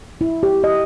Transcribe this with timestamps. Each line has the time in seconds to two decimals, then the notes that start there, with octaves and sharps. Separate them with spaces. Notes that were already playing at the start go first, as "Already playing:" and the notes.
0.21 E4
0.43 G4
0.64 D#5